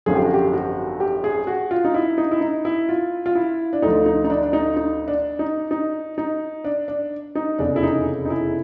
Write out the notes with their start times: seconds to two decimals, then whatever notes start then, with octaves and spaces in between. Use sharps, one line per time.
0.06 G#1 F#2 D3 F3 G#4
0.15 G4
0.25 F#4
0.34 G4
0.53 F#4
1.00 G4
1.24 G#4
1.47 F#4
1.71 F4
1.85 D#4
1.94 E4
2.18 D#4
2.31 E4
2.41 D#4
2.65 E4
2.89 F4
3.26 F4
3.35 E4
3.73 D4
3.82 D2 D3 F3 D#4
4.06 D#4
4.24 D#4
4.30 D4
4.43 D4
4.53 D#4
4.77 D#4
5.08 D4
5.39 D#4
5.71 D#4
6.18 D#4
6.64 D4
6.88 D4
7.35 D#4
7.59 F1 E2 C#3 D4
7.76 E4
7.83 D#4
8.25 D#4
8.30 E4